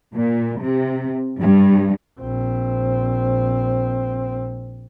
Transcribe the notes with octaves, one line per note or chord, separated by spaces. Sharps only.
A#2
C3
G2
A#1 C4